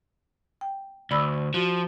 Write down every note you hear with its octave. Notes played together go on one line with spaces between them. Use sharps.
G5
D2 D5 B5 E6
F3 F#4